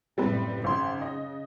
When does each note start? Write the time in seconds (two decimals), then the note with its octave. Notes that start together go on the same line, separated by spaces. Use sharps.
0.18 F#1 A2 G3 C4 B4
0.64 G#1 C#3 C6
1.02 D#5